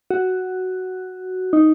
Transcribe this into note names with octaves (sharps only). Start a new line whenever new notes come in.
F#4
D#4